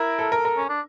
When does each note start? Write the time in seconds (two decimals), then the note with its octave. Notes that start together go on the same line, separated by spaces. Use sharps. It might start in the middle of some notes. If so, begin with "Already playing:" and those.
Already playing: E4 A#4
0.19 A4
0.32 A#4
0.45 A#4
0.57 C#4
0.69 D4